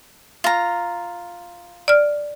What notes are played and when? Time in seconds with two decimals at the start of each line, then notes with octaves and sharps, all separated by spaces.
0.44 F4 A#5
1.88 D5 F6